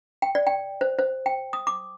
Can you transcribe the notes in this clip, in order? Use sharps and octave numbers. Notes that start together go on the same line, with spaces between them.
G5
D5
G5
C5
C5
G5
D#6
D6